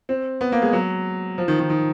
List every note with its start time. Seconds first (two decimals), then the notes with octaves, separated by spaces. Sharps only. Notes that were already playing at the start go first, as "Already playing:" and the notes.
0.09 C4
0.41 B3
0.52 A#3
0.62 G#3
0.73 F#3
1.38 F3
1.48 D#3
1.59 D#3
1.70 D#3